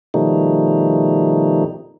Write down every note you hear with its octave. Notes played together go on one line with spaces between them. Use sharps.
B2 D#3 F3 G3 A3 D#4